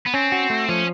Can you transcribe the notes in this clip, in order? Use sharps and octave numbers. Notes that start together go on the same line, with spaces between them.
B3
C4 C#4
F#4
A3
F3 C#4